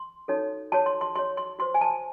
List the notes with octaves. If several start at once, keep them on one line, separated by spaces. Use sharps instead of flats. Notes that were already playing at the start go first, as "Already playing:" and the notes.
Already playing: C6
D#4 F#4 A4 C#5
F#4 C#5 A5
C6
C6
F#4 C#5 C6
C6
F#4 C5 C6
G#5
A5